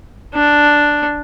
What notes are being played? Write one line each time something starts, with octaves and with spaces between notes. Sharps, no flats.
D4